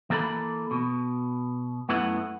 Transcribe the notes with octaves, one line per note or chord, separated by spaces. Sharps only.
E3 A#3 A4 F#5 B5
B2
F#2 A3 B3 E4 F#5